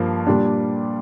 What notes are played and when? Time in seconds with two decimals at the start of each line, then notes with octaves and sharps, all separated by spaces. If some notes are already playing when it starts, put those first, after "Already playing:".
Already playing: G2 F3 A#3
0.27 A#2 G3 D4